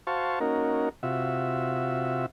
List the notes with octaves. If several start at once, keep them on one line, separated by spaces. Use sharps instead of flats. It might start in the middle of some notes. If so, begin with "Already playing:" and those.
F#4 C5 F5 A5 C#6
A#3 C#4 D#4 F#4 A#4
C3 F4 F#4 E5